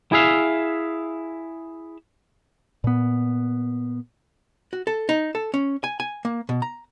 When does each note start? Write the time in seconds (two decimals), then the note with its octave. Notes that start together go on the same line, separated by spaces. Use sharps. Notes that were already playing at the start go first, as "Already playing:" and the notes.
0.12 E4 G#4 E5 F5
2.84 A#2 B3
4.73 F#4
4.87 A4
5.09 D#4
5.35 A4
5.54 C#4
5.84 G#5
6.00 G#5
6.25 A#3
6.49 B2
6.62 A#5